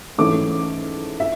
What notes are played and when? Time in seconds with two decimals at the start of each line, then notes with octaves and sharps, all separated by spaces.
0.18 G#2 E3 A3 C#4 D6
1.20 E5